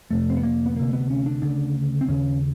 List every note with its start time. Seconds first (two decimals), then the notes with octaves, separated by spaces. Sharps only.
0.11 F2 C3 A3
0.30 C4
0.37 B3
0.43 A#3
0.66 B3
0.76 D2 C3 A#3
0.93 B3
1.10 C#4
1.26 D4
1.42 D2 C#3 D4
2.01 C4
2.08 D#2 C#3 C#4